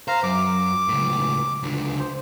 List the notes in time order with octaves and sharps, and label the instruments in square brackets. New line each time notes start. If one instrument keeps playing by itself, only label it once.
[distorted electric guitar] C5 [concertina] F5 A#5
[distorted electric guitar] F#2 [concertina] D6
[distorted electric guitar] C#2 A2
C#2 D3
[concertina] C5